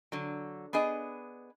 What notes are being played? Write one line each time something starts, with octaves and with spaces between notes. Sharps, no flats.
D3 F#3
B3 D4 G#4 D#5